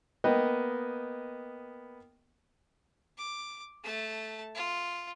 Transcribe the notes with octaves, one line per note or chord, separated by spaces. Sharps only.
A#3 B3 D#5 G5
D6
A3 A5
F4